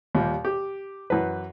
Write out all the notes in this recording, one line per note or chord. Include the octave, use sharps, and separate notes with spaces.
D#2 A#2 G3
G4
F#2 E3 B4